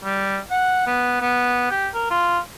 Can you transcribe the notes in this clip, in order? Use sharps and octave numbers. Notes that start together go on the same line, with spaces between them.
G3
F#5
B3
B3
G4
A#4
F4